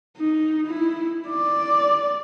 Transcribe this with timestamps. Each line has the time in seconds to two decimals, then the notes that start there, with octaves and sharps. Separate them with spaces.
0.17 D#4
0.66 E4
1.27 D5